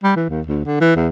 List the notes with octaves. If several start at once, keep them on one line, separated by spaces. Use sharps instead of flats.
G3
E3
D#2
D2
D3
E3
E2